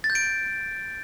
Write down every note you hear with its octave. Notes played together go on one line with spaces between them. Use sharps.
A6
G6
D7